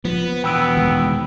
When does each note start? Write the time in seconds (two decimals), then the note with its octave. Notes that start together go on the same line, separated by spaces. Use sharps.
0.05 F3 B3
0.44 E2 B2 B3 G5 E6 D7
0.77 D#3 G#3